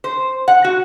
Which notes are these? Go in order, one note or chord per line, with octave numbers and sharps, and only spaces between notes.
C5
F#5
F#4